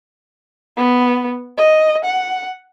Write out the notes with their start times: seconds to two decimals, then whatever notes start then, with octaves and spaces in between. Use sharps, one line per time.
0.77 B3
1.57 D#5
2.05 F#5